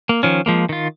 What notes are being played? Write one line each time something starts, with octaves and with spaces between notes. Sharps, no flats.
A#3
D#3 F3 C#4
F3 G#3 A#3
D#3 F4